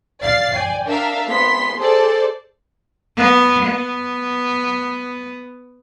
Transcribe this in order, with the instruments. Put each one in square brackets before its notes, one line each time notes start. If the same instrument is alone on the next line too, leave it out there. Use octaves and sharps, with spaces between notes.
[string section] D5 F5 A6 C7
D5 G5 G#5
D4 A#4 E5 F5
G#1 B3 C6 B6
G#4 A4 C5 D5
[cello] B3
B3